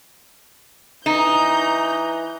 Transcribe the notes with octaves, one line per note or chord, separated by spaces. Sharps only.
E3 D#4 A#5 G6